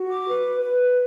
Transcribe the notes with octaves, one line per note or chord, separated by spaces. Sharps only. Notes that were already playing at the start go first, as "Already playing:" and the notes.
Already playing: F#4
D6
B4
B4